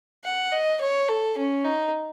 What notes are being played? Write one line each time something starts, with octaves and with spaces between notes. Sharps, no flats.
F#5
D#5
C#5
A4
C#4
D#4